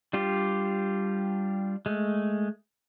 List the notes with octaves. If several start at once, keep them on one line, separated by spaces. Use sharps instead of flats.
G3 D4 F4 G4
G#3 A3